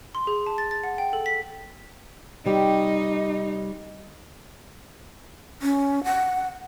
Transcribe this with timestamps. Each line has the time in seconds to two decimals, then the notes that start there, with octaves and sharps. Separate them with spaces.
0.15 C6
0.27 G#4
0.46 A5
0.58 A6
0.71 A6
0.84 F#5
0.98 G5
1.13 A4
1.26 B6
2.46 C3 G3 D#4 G4
5.62 C#4
6.04 F#5